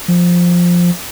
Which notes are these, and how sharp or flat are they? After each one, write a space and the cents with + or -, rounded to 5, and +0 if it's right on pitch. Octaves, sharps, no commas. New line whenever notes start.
F3 +5